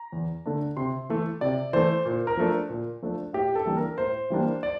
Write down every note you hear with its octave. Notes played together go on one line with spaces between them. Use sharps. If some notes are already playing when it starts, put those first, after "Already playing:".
Already playing: A#5
E2
D3 A3 D4
C3 C6
E3 A3
C3 D5
E3 A3 C5
A#2
A#4
F3 A3 D4
A#2
F3 A3 D4
A2 G4
A4
E3 G3 A#3 D4
A#4
A2 C5
E3 G3 A#3 D4
D5